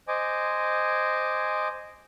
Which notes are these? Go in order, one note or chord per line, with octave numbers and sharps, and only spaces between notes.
C5 D#5 G#5 D6